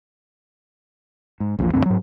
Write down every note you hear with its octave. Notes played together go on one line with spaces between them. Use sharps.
G#2
A#1 E2 A#2 F3
D2 G2 G3 C4
G#2 F#3